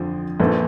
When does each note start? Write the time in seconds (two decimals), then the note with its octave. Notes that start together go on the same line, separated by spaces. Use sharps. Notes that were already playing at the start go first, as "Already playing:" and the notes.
Already playing: F2 D3 F3
0.39 A#1 A#2 F3 A4 B4